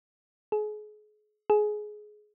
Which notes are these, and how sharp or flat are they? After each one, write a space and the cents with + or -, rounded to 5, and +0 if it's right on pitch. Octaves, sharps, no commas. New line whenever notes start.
G#4 +35
G#4 +20